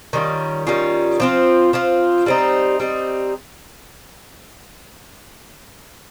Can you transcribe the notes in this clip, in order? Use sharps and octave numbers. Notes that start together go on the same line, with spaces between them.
D#3 G3 C#4 F4
D#3 G3 C#4 F4
F3 C4 F4
F3 C4 F4
G3 C4 D#4
G3 C4 D#4